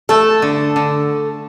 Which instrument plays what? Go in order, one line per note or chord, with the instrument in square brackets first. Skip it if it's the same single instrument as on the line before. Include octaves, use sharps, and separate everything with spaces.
[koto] A3 [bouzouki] A4
[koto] D3
D3